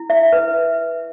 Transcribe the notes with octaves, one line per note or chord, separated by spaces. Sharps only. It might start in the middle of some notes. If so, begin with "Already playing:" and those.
Already playing: E4
E5
B4